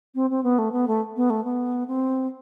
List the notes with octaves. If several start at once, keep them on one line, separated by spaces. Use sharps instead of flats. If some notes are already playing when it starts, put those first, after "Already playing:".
C4
C4
B3
A3
B3
A3
B3
A3
B3
C4